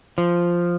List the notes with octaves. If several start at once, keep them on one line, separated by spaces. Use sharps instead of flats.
F3